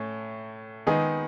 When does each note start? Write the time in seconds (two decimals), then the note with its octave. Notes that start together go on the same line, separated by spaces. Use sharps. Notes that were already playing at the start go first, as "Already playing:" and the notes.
Already playing: A2 A3 C#4
0.87 D#3 G#3 B3 D#4 G#4